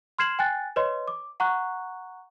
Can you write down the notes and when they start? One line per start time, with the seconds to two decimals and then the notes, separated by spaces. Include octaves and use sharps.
0.18 C6 F6 G#6 C7 E7 F#7
0.39 G5 G#5 F#6 A6
0.76 B4 C#5 D#5 C6
1.08 D6
1.40 F#5 A#5 C#6 F#6